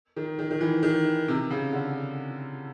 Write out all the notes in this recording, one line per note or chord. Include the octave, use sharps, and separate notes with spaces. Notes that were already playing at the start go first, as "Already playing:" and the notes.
D#3
D#3
D#3
E3
D#3
C3
C#3
D3